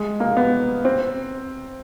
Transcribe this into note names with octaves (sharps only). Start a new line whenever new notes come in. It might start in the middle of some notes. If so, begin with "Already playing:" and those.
Already playing: G#3
A#3
B3
C4